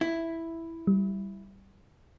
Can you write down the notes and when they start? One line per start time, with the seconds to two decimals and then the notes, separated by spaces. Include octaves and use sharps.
0.01 E4
0.87 G3